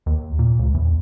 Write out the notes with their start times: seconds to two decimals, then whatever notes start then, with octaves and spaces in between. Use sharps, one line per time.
0.06 D#2
0.39 A#2
0.59 C#2
0.74 E2